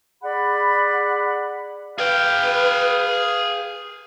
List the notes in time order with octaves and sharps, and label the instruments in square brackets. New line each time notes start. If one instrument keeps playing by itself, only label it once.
[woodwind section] G#4 D5 F#5 B5
[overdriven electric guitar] G#4 G5 [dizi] B4 [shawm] F5